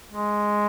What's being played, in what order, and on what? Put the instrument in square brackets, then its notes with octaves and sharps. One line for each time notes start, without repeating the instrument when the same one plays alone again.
[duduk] G#3